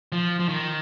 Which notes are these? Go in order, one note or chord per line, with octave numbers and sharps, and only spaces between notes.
F3
F3
D#3